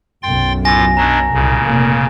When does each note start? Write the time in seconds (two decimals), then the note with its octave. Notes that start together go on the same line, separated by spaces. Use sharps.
0.23 B1 F#2 G5 C6 A6
0.65 A2 F4 G#5 D6 A#6
0.97 B2 F#3 D4 A#5
1.34 C2 A#2 C#3
1.63 F1 A#3